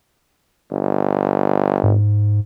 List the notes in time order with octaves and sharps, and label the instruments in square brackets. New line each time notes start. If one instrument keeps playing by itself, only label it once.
[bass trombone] G1
[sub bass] G#2